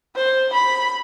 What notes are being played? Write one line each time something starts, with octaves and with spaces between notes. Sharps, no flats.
C5
B5